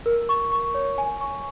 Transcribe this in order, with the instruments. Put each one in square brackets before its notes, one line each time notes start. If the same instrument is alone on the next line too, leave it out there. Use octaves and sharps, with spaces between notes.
[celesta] A#4
C#6
C#6
C#5
G#5
C#6